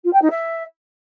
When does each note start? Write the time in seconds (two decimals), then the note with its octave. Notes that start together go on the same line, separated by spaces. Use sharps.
0.04 F4
0.13 G5
0.21 D#4
0.30 E5